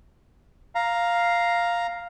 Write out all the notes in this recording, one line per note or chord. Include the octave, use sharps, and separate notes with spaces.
F5 A#5